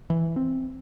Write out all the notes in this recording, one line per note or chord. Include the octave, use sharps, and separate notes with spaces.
E3
C4